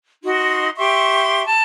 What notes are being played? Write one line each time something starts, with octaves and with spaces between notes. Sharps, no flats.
D#4 F#4 C6
G4 E5 C6 C#6
A5